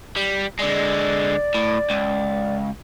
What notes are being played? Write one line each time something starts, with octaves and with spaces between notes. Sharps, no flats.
G3
D3 G#3 D5
A2
C#2